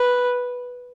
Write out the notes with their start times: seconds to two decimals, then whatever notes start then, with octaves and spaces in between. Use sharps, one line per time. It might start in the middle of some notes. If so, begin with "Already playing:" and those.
Already playing: B4